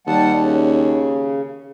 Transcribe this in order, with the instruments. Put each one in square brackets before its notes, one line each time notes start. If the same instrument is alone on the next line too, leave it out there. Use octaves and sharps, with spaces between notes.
[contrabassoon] D#2 [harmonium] G3 F#5 A5
[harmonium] C#3